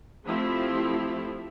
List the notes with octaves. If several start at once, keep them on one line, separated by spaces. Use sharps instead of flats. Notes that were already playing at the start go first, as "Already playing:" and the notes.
F3 A3 C4 E4 F4 G4